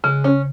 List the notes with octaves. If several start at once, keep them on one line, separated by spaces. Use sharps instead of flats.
C#3 G#3
C#4